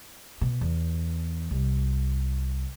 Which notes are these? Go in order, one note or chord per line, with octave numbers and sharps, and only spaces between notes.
B2
E2
C2